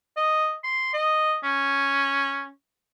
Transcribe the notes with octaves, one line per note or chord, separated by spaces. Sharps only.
D#5
C6
D#5
C#4